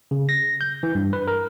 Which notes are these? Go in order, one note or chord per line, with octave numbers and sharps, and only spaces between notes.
C#3
A#6
G6
E3
G2
B4
A#4